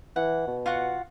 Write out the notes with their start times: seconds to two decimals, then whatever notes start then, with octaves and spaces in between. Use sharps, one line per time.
0.16 E3 F#5
0.47 B2
0.66 F4 F#4 F#5